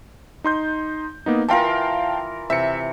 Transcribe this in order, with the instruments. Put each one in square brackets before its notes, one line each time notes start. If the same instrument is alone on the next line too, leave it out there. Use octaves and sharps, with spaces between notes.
[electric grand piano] D#4 C6 G6
A#3 B3 D#4
[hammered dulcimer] E3 F4 A#4 [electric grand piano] F5 G5 A5
[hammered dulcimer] C3 E3 [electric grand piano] E5 C#7